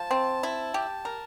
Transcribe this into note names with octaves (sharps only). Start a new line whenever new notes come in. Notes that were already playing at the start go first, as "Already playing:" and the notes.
Already playing: F3 A5
C4
E4
G4
A#4